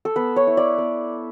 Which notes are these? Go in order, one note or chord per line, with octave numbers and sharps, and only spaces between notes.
A4
B3 B4
C#5
E4
D5
B3